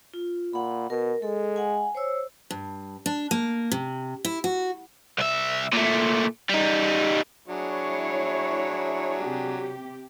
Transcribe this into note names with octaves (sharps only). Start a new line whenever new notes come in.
F4
A#2 F#5 B5
B2 A#4
G#3 A4
F#5 G#5
C5 C#5 E6
G2
D4
A#3
C3
E4
F#4
C2 E5
A#2 A3
G3 D#4
F#3 D4 E4 G#4 C#5
C3 G4